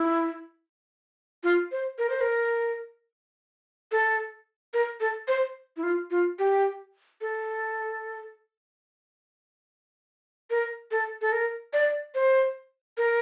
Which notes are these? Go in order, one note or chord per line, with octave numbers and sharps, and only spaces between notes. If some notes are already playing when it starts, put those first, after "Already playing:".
Already playing: E4
F4
C5
A#4
C5
A#4
A4
A#4
A4
C5
E4
F4
F4
G4
A4
A#4
A4
A4
A#4
D5
C5
A#4